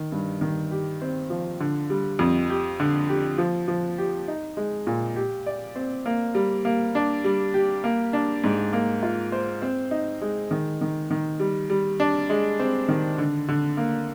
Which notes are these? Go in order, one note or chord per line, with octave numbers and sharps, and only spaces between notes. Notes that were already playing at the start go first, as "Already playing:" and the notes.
Already playing: D#3
G2
D#3
G4
C4
F3
D3
G3
F2
G4
D3
G4
F3
F3
G4
D#4
G#3
A#2
G4
D5
C4
A#3
G3
A#3
D4
G3
G4
A#3
D4
G#2
A#3
F4
C5
C4
D#4
G#3
D#3
D#3
D#3
G3
G3
D4
G#3
C4
D#3
D3
D3
A#3